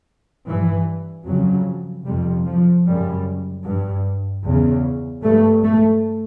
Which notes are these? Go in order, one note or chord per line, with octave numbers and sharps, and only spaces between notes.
G2 E3
F2 C#3 F#3
F2 C3 G3
F3
F#2 C#3 G3
G2
E2 C#3
G2 A3
A3